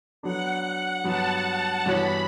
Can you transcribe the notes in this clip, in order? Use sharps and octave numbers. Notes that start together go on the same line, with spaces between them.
F#3 B3 D4 A4 F#5
G2 F#3 B3 A5
G2 E3 B3 F#4 C#5 B5